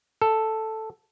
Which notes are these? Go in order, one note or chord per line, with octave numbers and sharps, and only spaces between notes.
A4